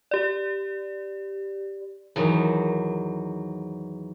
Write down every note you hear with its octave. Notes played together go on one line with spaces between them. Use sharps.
G4 D5
E2 D#3 F#3